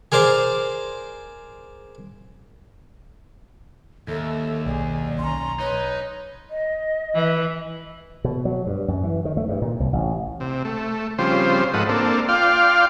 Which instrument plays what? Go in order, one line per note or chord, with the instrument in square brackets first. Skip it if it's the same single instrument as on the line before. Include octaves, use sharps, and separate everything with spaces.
[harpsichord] G#4 A#4 C5 D5 C6
[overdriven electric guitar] D#2 [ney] A4 [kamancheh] E5
[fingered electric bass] B1 [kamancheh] G#4 [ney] D5
[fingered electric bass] B1 [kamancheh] C#4 A#5 [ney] C6
[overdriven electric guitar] D#4 [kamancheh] B4 [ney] C#5
[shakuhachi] D#5
[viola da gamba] E3
[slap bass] B2
F#3
G2
F#2
E3
D#3
A3
G2
A#2
C2
A1
[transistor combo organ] C3
A3
C#3 F3 G3 C4 C5
G#2 F3 A4 B4 D#5 F#5
A#3 C4 D4 A4
F4 D5 F5 G5 C6